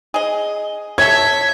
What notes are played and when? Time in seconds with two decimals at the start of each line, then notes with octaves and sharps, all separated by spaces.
0.14 G#4 D#5
0.98 A4 C#5 E5 G#6